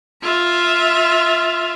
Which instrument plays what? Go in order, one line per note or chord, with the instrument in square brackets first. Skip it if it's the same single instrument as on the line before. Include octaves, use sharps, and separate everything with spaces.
[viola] F4 E5